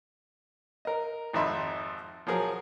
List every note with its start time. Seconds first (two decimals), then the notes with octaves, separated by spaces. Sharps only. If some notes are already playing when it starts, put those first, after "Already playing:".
0.85 A#4 D#5
1.33 G#1 F2 D#4 E5 B5 C6
2.27 F3 F#3 G#4 A#4